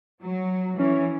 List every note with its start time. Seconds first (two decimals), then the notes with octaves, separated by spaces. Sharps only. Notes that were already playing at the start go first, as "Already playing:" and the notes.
0.24 F#3
0.79 E3 C#4